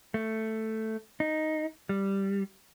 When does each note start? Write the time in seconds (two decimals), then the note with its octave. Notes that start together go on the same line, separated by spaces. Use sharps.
0.14 A3
1.20 D#4
1.89 G3